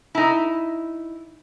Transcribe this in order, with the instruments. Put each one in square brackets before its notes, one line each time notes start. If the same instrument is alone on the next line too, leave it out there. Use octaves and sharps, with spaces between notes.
[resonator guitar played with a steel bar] D#4 E4